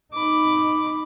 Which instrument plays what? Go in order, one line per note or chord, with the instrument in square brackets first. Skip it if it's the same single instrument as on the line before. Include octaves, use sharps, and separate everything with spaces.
[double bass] D#4 [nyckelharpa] B5 D6